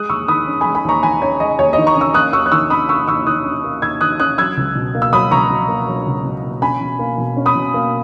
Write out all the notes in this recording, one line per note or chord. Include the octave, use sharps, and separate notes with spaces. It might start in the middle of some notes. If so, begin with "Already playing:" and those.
Already playing: G#3 D#6 F#6
D#2 C#6 E6
D#3 B5 D#6
C#4
G#3 G#5 B5
G#5 B5
D#2 A#5 C#6
D#3 G#5 B5
C#4 C#5
G#3 D#5
D#2 C#5
D#3 D#5
A#5 C#6
C#4
C#6 E6
A#3 D#6 F#6
D#2 C#6 E6
F#6
D#3 C#6 E6
C#4 B5 D#6
A#3 C#6 E6
D#2 C#6 E6
D#3 D#6 F#6
C#4
A#3
D#2 E6 G#6
D#3 D#6 F#6
C#4 D#6 F#6
F#3 E6 G#6
C#2
B2
A#3
E6
F#3 B5 D#6
C#2 A#5 C#6
B2
A#3
F#3
C#2
B2
A#3
C#4 G#5 B5
B2
A#3
B2
C#4
B5 D#6
B2
A#3